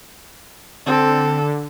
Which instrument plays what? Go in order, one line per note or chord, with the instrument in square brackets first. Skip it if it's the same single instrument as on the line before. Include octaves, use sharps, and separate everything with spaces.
[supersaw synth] D3 [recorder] C4 [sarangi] A4